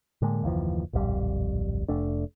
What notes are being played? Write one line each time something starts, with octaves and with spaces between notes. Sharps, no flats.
A2 D3 G#3 A#3
F#1 D#2 E3 F3
D1 A#1 F2 G3
F1 A3 D4